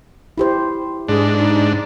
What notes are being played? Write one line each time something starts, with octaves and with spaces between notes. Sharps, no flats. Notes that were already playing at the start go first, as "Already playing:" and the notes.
E4 G4 C5
G#2 D4 G#4
D#4